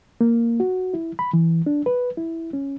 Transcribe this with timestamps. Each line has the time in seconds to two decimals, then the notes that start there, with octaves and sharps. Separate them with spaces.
0.21 A#3
0.60 F#4
0.94 E4
1.19 B5
1.33 E3
1.66 D4
1.86 B4
2.17 E4
2.53 C#4